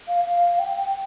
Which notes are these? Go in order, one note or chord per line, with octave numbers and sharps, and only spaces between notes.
F5
F5
G5